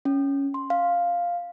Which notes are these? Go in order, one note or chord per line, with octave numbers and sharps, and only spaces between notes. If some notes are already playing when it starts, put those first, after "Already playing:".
C#4
C6
F5